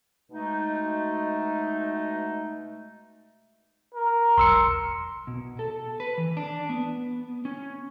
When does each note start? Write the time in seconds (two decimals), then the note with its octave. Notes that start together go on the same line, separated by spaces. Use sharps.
0.31 B2 G#3 A3 D#4
3.94 A#4
4.38 E1 B1 C6 E6 C#7
5.27 B2
5.59 A4
6.00 B4
6.18 E3
6.37 D4
6.69 B3
7.45 C#4